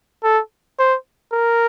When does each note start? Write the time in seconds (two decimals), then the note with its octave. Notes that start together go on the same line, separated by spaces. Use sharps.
0.23 A4
0.79 C5
1.32 A#4